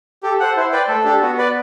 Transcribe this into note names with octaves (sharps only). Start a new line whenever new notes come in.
G4 A4
C5 F#5
E4 C5
B4 D5 G5
A3 A4
D4 G4
B3 F#4
B4 D5